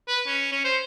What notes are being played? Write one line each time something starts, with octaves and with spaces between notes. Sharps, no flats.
B4
C#4
C#4
C5